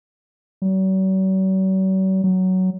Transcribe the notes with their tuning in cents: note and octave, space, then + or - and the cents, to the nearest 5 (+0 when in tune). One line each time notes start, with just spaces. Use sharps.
F#3 +45
F#3 +10